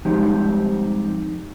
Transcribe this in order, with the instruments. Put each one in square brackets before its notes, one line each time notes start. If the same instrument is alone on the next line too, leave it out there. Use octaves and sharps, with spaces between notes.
[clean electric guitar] F3 G3 G#3 C4 D#4 G4